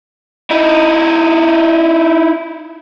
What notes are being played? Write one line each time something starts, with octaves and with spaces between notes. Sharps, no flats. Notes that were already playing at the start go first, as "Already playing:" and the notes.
D#4 E4